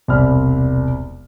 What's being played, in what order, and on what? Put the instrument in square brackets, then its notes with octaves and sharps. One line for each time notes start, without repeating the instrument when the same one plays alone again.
[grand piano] E1 C2 C4 D5 B5 F6